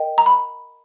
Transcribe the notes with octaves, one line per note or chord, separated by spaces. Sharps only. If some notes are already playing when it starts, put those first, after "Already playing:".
Already playing: A#4 D#5 G5
A#5
B5